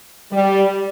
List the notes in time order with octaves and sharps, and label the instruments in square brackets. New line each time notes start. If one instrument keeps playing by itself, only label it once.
[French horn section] G3